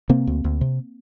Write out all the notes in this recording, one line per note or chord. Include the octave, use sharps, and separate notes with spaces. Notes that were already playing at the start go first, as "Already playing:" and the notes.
C3 A#3 C4
D2
D2
C3